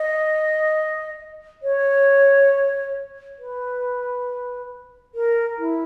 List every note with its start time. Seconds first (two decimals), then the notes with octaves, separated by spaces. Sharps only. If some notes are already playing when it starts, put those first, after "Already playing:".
Already playing: D#5
1.63 C#5
3.39 B4
5.15 A#4
5.58 E4